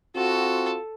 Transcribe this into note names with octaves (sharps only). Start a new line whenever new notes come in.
C4 F4 F#4 A4